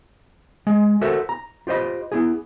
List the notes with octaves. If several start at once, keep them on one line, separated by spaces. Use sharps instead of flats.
G#3
F#4 A4 A#4 C5 E5 F#5
A#5
F4 G4 C5 D#5 B5
B3 E4 G#4